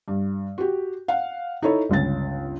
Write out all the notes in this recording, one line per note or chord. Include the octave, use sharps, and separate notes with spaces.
G2
F#4 G4
F5 F#5
D#4 E4 A4 C#5
G1 C#2 C#3 A6